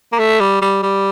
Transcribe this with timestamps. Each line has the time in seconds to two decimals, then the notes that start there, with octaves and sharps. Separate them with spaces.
0.13 A#3
0.19 A3
0.40 G3
0.62 G3
0.83 G3